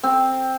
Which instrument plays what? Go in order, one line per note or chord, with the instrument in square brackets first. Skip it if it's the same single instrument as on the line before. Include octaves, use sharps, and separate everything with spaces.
[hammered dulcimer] C4